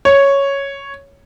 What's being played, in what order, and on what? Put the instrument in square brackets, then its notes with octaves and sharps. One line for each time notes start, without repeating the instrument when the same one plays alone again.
[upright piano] C#5